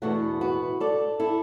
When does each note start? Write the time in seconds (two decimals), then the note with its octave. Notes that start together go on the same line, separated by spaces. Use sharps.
0.02 E2 B2 A3 D4 F#4
0.41 F#4 B4
0.80 A4 D5
1.20 E4 A4